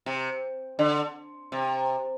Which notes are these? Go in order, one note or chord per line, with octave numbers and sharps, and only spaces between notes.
C3
D3
C3